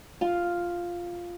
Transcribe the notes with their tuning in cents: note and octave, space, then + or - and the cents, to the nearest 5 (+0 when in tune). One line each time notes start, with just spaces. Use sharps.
F4 +0 F5 +0